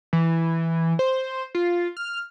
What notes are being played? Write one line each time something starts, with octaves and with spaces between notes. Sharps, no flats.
E3
C5
F4
F6